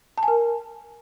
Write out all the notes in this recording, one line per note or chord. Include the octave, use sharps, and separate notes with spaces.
A5
G#5
A#4